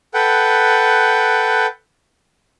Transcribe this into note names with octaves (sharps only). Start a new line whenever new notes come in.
A4 B4 F#5 G5